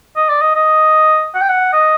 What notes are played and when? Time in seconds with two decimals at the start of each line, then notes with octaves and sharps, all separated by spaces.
0.16 D#5
0.29 D5
0.41 D#5
0.55 D#5
1.35 F#5
1.41 G5
1.49 F#5
1.73 D#5